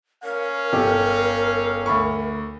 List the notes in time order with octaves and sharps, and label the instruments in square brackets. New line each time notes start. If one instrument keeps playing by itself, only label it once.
[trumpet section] C#4 F5 [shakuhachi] A#4
[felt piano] G1 A4 D6 [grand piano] G4
[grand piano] D2 B5 C#6